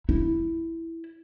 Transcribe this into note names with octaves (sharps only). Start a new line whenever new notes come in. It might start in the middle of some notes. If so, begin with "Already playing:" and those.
E4